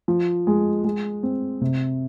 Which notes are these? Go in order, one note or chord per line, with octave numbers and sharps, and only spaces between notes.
F3
G#3
G#3
C4
C3